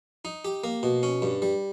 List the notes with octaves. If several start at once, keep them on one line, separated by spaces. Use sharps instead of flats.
D#4
G4
A#3
B2
C#4
G2
G3